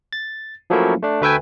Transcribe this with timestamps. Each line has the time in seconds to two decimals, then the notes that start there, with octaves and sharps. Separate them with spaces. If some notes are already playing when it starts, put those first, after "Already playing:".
0.13 A6
0.70 F3 F#3 A3 A#3 C#4 E4
1.03 A3 D4
1.21 D2 A3 B4 E5 G5 G#5